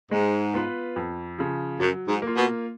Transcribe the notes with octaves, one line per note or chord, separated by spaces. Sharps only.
G#2 G#3
B3 F4 B4
F2
C#3 F3
F#2 F#3
G#2
A#3
F4
B2